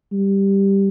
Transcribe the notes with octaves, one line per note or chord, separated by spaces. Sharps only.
G3